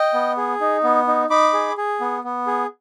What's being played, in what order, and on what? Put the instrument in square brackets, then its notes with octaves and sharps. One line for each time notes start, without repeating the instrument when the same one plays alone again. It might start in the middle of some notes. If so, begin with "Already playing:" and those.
Already playing: [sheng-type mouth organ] D#5 G5
B3
G#4
D#4
B3
D#4
D#4 B5 D6
G#4
G#4
B3
B3
G#4